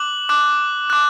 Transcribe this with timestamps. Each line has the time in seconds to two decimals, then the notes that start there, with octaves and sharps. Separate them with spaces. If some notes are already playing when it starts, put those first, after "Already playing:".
Already playing: D6 F#6 F#7
0.29 D6 F#6
0.90 D6 F#6